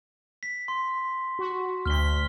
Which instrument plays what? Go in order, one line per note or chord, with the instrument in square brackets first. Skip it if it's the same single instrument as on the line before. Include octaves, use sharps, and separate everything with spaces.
[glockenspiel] B6
C6
[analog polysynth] F#4
[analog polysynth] D2 B6 [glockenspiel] F6 G7